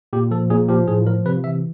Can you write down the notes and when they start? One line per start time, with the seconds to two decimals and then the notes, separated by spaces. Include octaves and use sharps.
0.13 A#2 G4
0.31 F3 A4
0.50 A#2 G#4
0.69 F3 G4
0.88 A2 G#4
1.07 F3 A#4
1.26 C3 B4
1.44 E3 E5